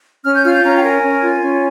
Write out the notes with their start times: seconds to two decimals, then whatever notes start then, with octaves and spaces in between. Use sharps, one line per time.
0.23 C#4 F6
0.34 G6
0.43 F4 F6
0.53 G6
0.63 C#4 A#5
0.76 G5
0.83 A#4 G#5
1.02 C#4
1.21 F4
1.41 C#4